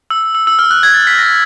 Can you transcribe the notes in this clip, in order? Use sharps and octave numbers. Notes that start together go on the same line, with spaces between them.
E6
E6
E6
F6
F#6
G#6
A6
B6
A#6